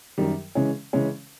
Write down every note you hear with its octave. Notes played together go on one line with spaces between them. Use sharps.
F#2 D#3 G3
C#3 E3 G#3 C#4
C#3 E3 G#3 C#4